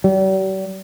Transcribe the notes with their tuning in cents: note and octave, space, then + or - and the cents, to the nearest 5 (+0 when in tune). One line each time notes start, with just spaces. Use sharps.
G3 -45